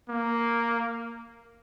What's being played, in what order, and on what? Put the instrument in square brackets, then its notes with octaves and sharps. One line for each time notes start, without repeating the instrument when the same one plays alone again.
[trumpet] A#3